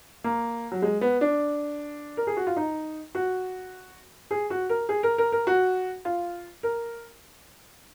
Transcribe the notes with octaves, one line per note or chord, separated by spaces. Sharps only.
A#3
F#3
G#3
B3
D4
A#4
G#4
F#4
F4
D#4
F#4
G#4
F#4
A#4
G#4
A#4
A#4
A#4
F#4
F4
A#4